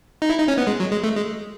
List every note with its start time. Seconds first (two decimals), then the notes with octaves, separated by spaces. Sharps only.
0.22 D#4
0.30 E4
0.39 D#4
0.48 C#4
0.58 B3
0.67 G#3
0.80 F#3
0.92 G#3
1.04 A3
1.16 G#3